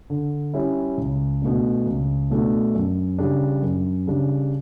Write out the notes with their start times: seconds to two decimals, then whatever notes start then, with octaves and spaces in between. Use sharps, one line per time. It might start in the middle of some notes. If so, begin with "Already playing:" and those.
0.10 D3
0.54 G3 C#4 E4
0.98 C#2
1.42 B2 A3 D4
1.86 C#2
2.30 B2 A3 D4
2.75 F#2
3.18 C#3 G3 D4
3.62 F#2
4.07 C#3 G3 D4